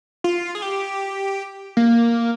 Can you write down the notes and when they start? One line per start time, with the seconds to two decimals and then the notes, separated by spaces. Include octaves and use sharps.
0.24 F4
0.55 G#4
0.62 G4
1.77 A#3